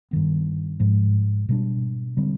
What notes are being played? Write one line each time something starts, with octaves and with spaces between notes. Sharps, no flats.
G2 D#3 B3
G#2 F3 G#3
B2 G3 D4
D3 G3 C4